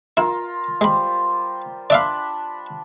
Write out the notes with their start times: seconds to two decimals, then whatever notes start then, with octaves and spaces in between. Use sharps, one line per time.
0.17 E4 F4 A#4
0.81 G3 G#3 C5 B5
1.90 D4 D5 E5 F5 B5